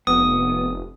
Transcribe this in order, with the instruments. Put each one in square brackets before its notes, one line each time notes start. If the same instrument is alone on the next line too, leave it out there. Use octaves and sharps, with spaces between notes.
[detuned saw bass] F1 [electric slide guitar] B3 [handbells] D#6